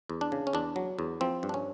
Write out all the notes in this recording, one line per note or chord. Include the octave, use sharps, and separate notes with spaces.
E2
D4
C#3
C#4
E2 D4
F#3
E2
F3 C4
G2
D4
C#4